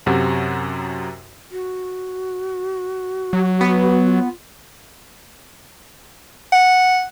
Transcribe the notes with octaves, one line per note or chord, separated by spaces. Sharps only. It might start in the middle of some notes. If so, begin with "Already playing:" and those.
F#2 C3 F#4
F#4
F#3
B3
F4
F#5